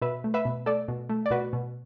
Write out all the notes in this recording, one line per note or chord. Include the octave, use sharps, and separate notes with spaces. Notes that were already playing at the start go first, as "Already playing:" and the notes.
B2 B4 E5
A3
B4 E5
B2
A3 A4 D5
B2
A3
D5
B2 F#4 B4
B2